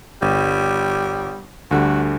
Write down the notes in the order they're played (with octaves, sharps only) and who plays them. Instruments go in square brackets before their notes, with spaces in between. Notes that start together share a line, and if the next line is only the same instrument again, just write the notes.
[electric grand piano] G1 [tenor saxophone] G3
[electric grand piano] D2 D3 G3 [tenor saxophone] F#4